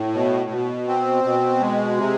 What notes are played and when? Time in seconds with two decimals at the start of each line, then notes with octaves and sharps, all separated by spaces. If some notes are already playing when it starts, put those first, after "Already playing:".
Already playing: A2
0.14 B2
0.50 B2
0.87 C4
1.24 B2
1.60 G#3
1.97 C3